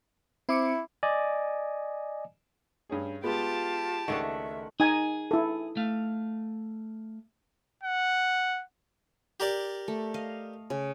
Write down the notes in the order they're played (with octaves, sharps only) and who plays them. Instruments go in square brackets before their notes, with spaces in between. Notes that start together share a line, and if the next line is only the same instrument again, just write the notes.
[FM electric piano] C4 D6 C#7 [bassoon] E4
[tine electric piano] D5 D#5 G#5
[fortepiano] G2 C#4 G#4
[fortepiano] G#3 B3 [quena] F4 [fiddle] G4 A5
[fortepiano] C#2 F#5 C#6 [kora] D#3 A3 D4 [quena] E5
[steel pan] D#4 G#5 [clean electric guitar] G#4
[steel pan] E4 A4
[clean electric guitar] A3 F5
[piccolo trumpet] F#5
[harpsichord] G4 A#4 D5
[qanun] A3
D#5 F5
C#3